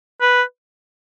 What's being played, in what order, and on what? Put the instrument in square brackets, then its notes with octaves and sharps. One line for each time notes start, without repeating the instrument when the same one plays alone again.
[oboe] B4